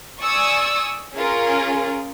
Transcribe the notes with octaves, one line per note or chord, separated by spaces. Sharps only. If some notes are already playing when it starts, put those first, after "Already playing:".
D5 G#5 C#6 D#6 E6
C#4 F4 G#4 A#4